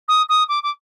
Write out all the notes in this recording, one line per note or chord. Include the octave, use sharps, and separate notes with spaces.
D#6
D#6
D6
D6